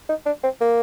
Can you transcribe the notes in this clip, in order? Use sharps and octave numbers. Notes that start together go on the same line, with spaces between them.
D#4
D4
C4
A#3